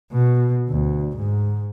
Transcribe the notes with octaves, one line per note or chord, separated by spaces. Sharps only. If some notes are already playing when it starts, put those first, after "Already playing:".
B2
D2
G#2